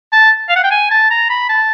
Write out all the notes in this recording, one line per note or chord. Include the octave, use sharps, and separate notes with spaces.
A5
F5
F#5
G5
G#5
A5
A#5
B5
A5